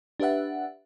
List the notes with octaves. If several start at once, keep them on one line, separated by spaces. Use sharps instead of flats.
D4 G4 B4 E5 F#5